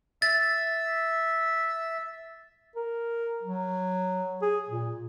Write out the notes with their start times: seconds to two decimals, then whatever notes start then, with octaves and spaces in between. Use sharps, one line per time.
0.22 E5 A6
2.76 A#4
3.43 F#3
4.42 G#4
4.69 A#2